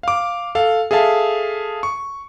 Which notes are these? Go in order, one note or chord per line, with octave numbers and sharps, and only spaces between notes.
F5 D6
A4 F5
G#4 A4 E5 F5 A5
C#6